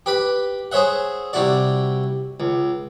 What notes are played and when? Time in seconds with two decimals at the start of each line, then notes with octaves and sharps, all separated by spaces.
0.06 G4 B4 B5
0.72 G#4 C5 C#5 E5 F#5
1.33 C3 G3 E4 F#4 D5
2.40 C#2